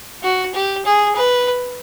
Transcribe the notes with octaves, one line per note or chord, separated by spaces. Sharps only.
F#4
G4
G#4
B4